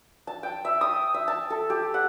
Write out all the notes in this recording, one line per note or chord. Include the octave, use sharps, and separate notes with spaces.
A5
G5
E5
D#6
E5
A5
A4
G4
F#5